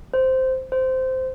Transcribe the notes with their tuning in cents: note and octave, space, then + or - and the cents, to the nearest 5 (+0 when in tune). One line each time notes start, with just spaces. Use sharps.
C5 -5
C5 -10